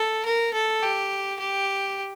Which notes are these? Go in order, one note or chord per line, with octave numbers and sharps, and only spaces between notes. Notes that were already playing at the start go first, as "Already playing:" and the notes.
Already playing: A4
A#4
A4
G4
G4